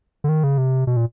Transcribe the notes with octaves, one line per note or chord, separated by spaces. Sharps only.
D3
D#3
C#3
C3
B2
A#2